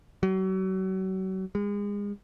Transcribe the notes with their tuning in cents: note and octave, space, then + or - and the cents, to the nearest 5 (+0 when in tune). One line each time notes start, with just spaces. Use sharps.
F#3 +35
G#3 -30